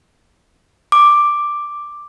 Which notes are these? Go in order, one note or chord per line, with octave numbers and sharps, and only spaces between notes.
D6